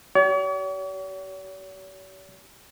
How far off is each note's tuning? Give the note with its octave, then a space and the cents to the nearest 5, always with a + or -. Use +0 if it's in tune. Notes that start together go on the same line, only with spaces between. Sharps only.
G4 -45 C#5 +45